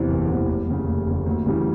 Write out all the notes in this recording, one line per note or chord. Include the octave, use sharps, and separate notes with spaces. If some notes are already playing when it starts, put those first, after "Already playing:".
Already playing: E2 C3 E3
F#1
E2 C3 E3
F1
D#2 C#3
F1
D#2 C#3
D2
C#3 E3 G3